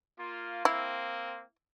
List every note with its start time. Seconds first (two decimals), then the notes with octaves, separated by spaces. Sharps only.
0.18 A#3 F4
0.65 A#3 C4 E4